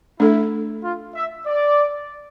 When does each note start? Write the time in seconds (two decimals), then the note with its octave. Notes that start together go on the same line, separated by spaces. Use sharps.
0.19 A3 D4 E4 A4
0.82 F4
1.14 E5
1.46 D5